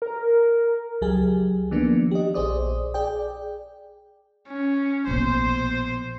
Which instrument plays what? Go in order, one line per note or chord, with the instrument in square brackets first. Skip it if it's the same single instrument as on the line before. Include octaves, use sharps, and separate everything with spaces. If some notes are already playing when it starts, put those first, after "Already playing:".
[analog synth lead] A#4
[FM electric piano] C#2 F#3 G4 G#4 G#5
D#3 F3 A#3 B3 D4
G4 D#5
A#1 G#4 C5 D5 D#6
G#4 D5 G5
[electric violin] C#4
[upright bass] A#1 B2 [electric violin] C5